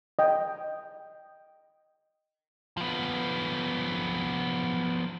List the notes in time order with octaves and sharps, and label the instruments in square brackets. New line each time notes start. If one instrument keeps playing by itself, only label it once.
[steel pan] D#5 G5
[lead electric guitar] F3 B3